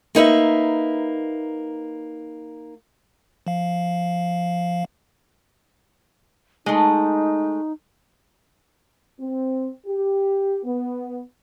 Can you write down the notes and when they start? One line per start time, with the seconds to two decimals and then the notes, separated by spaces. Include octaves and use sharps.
0.15 A#3 D#4 B4 E5
3.47 F3 F5
6.66 G#3 A3 D#4
9.20 C4
9.87 G4
10.65 B3